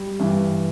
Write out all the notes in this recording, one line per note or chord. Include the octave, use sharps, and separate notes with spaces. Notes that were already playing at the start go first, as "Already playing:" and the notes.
Already playing: G3
G2 E3